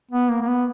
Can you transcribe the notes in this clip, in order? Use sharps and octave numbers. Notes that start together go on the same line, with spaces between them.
B3
A#3
A#3
B3